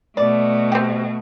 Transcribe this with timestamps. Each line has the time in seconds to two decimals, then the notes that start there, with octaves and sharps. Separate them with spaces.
0.17 B2 A3 D5
0.72 C4 G4